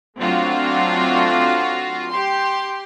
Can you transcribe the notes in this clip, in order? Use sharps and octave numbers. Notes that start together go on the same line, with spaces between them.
F#3 A3 C4 D4 F4 F#4
G4 C6